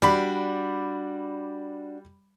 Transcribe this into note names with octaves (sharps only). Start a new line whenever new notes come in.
G3 D4 F#4 D5 B5